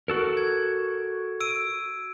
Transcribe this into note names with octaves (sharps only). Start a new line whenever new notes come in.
F#4 A4 A#4
G#6
E6 D7 D#7